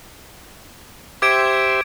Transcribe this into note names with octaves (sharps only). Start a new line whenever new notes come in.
G4 C5 E5 D6 G#6 D7